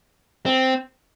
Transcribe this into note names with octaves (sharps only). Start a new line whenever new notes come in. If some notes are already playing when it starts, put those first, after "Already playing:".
C4